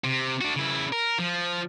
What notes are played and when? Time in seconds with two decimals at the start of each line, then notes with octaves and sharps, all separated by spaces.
0.04 C3
0.41 D4 F#4
0.56 C#3 E4
0.93 A#4
1.18 F3